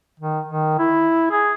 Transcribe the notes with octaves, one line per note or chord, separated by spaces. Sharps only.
D#3
D#3
E4
G#4